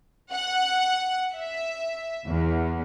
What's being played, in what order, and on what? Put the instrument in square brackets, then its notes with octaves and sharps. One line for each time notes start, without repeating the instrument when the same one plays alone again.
[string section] F#5
E5
E2